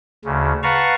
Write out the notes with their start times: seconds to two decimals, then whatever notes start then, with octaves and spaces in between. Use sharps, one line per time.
0.25 D2 C#3
0.63 B4 F5 F#5 A5 A#5 C#6